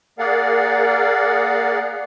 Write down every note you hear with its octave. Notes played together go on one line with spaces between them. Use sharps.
A#3 G#4 A#4 D5 F5 F#5